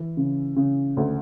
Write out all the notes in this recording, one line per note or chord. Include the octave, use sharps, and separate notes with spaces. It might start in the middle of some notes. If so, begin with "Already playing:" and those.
Already playing: E3
C#3
C#3
D2